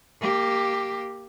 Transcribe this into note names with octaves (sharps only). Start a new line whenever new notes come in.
A#3 G4